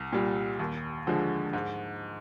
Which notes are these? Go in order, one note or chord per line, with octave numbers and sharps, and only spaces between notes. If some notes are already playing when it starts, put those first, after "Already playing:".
Already playing: C2
A#2 G3
D#2
D3 F3 G#3
G#2